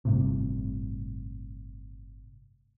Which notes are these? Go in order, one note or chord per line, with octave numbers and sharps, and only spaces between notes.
G1 A2 C3